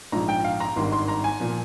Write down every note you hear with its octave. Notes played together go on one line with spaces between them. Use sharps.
A#1 G#2 F3 A#5
G5
F5
A#5
G#1 G2 D#3 C6
C6
A#5
G#5
A#2 F3